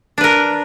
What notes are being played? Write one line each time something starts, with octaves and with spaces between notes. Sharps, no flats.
D4 A#4 B4